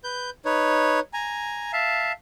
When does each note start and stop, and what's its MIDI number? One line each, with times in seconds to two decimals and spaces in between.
0.04 0.30 71
0.04 0.30 91
0.45 1.00 63
0.45 1.00 71
0.45 1.00 73
1.13 1.72 80
1.13 1.72 82
1.73 2.12 76
1.73 2.12 77
1.73 2.12 81